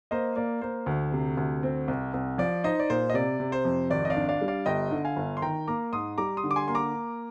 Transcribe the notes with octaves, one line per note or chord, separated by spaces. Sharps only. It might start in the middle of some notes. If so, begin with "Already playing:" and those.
A#3 C5 D#5
A#3 D5
A#3 C5
D2
C3
D2
C4
C2
C2
F3 D5
D#4 C5 D#5
D5
A#2 C5
D#5
C3 D5
C3
C5
F2
G#1 D5
D#5
D5 F5
D4
D5 F5
G3
D5 F5
G1 D#5 G5
D3
F5 G#5
G1
C6
D#3 G5 A#5
A#3 A#5 D6
G#2 C6 D#6
G3 A#5 D6
C6 D#6
D3
D6
G#5 C6
A#3 C6
A#5 D6